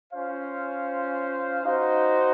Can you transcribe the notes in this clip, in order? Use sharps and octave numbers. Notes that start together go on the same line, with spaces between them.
C#4 F4 C5 F5
D#4 F#4 C5